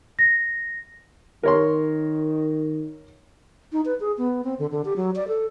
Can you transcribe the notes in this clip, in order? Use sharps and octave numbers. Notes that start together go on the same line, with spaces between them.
A#6
D#3 A#4 C#5 C6
D#4
B4
G#4
B3
C4
D3
D3
G4
F#3
D5
A4